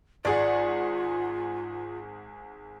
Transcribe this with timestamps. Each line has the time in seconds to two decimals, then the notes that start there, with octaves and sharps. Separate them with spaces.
0.25 G#1 F4 G#4 D5 F#5